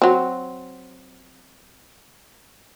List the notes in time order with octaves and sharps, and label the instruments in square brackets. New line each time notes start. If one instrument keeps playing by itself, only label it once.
[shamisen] F#3 C4